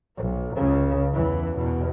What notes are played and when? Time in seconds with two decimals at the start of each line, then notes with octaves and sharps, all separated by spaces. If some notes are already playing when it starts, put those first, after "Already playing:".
0.18 B1
0.56 C#2 C#3
1.14 E2 E3
1.56 E2 B2